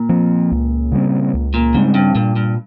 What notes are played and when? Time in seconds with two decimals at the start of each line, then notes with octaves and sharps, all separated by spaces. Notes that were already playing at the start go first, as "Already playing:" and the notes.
Already playing: A#2
0.09 F3 C4
0.52 C#2
0.92 C#3 G3 C4
1.34 C#2
1.54 A#2
1.74 G#2 C#3 G3 C4
1.94 G2
2.15 G2 A#2
2.36 G2